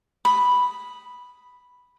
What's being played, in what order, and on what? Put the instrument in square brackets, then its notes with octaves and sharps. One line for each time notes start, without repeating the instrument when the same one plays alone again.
[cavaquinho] B5 D#6